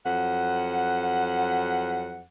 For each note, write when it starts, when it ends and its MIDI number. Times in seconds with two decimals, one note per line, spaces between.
0.05 2.23 41
0.05 2.23 54
0.05 2.23 78